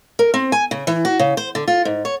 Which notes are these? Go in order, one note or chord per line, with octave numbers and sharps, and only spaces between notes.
A#4
C4
G#5
C#3
E3
F#4
C#3
C5
D3
F4
G#2
C#5